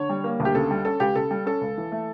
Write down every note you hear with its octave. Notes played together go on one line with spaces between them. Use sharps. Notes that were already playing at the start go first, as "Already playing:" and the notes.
Already playing: D3 C#5
G3
A#3
D2
G4
C#3 A4
G3
C#4 A4
C#2 G4
C#3 A4
G3
C#4 A4
C#2
E3
A3